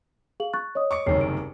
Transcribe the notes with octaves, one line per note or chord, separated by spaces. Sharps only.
G#4 F5 F#7
C#6 F#6 A6
C#5 D#5 D#6
C#6 D6 C#7
F#1 C2 D#3 C#5 C7
D7